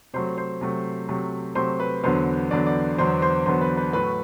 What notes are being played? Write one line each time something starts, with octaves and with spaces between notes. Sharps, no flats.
C3 F#3 A3 C5
C5
C3 F#3 A3
C3 F#3 A3
C3 F#3 A3 C5
B4
E2 D3 F#3 B3 C5
E2 D3 F#3 B3 D5
D5
E2 D3 F#3 B3 C5
C5
E2 D3 F#3 B3 C5
B4
B4
A2 F#3 A3 B4